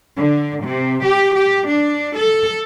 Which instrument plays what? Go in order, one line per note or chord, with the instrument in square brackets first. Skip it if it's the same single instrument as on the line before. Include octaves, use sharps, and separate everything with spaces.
[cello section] D3
C3
G4
G4
D4
A4